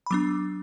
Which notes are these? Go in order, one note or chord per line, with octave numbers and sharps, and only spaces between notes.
B5
F#3 B3 D4 D6